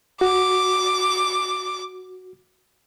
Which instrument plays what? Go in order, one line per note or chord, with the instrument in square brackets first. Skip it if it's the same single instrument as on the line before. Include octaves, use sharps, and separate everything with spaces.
[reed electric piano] F#4 [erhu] D6